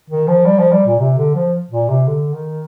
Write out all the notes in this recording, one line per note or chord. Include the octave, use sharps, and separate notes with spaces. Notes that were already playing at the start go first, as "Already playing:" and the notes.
D#3
F3
G3
F3
G3
A#2
C3
D3
F3
A#2
C3
D3
D#3